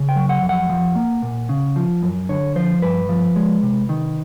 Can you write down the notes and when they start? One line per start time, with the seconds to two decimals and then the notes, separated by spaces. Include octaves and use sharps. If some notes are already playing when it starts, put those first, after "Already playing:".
Already playing: C#3
0.09 G5
0.16 F#3
0.29 F#5
0.42 F2
0.49 F#5
0.69 F3
0.95 A#3
1.22 A#2
1.49 C#3
1.76 F3
2.03 F#2
2.29 D3 C#5
2.56 F3 C5
2.82 G2 B4
3.09 F3
3.36 G#3
3.63 C3
3.89 D#3